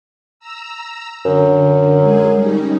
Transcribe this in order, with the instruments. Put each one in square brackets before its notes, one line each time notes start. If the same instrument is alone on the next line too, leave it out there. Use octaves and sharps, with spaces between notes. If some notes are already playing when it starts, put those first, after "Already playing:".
[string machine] A#5 E6
[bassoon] F#2 [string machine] D3
[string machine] G#3 G#4
G3 C#4 D#4